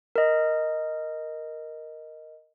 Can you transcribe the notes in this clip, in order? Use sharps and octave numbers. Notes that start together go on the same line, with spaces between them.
A#4 D#5